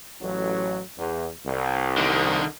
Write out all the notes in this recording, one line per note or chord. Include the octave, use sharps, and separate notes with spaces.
A1 F#3
E2
C2
D3 D#3